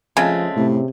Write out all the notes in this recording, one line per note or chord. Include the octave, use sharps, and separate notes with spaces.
C#3 F3 G#3 A3 C4
A2 C3